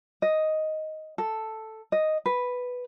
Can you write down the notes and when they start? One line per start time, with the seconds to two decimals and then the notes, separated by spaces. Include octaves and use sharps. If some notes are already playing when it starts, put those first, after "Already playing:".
0.22 D#5
1.18 A4
1.92 D#5
2.26 B4